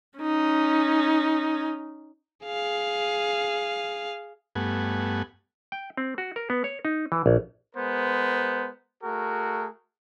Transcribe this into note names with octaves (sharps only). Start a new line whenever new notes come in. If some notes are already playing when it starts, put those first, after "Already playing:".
C#4 D#4
G#4 F5
G2 A3 B3 F#5 G#5
G5
C4
F#4
A#4
B3
C#5
D#4
E3
A#1
G#3 B3 A#4 C5
A3 F#4 G#4 A#4